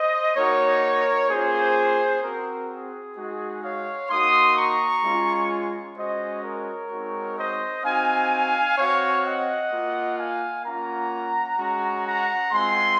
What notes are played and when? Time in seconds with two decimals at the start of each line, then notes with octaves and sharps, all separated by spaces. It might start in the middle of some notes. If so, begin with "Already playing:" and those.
Already playing: C5 D#5
0.35 A#3 D#4 F#4 A#4 C#5
1.29 A#3 C#4 F4 G#4 C5
2.22 C4 F#4 A#4
2.69 G#4
3.15 G#3 D#4 F#4
3.62 C#5 F5
4.10 A#3 D#4 F#4 C6 D#6
4.56 A#5 C#6
5.03 G#3 C#4 F4
5.96 G#3 C#4 F#4 C5 D#5
6.43 A#4 C#5
6.90 G#3 C4 D#4 F#4
7.37 C5 D#5
7.84 C4 D#4 F#4 F5 G#5
8.78 C4 F#4 C#5 F5
9.24 D#5 F#5
9.71 A#3 F4
10.17 F5 G#5
10.64 A#3 C#4 F4 F#5 A#5
11.58 G#3 C#4 F#4
12.04 F#5 A#5
12.52 G#3 C4 F4 G#5 C6